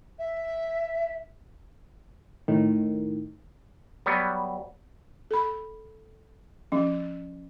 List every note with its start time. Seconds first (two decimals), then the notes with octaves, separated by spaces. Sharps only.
0.18 E5
2.48 A2 D#3
4.06 F#3 G3 B3
5.31 A4 B5
6.72 F3 C#4